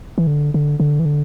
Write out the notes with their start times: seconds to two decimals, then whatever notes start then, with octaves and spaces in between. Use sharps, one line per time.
0.18 E3
0.27 D3
0.54 D3
0.80 D3
0.99 E3
1.05 D3